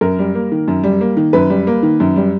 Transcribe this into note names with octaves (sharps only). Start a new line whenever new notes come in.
F#2 A#4
G3
A#3
D#3
F#2
G3
A#3
D#3
F#2 B4
G3
A#3
D#3
F#2
G3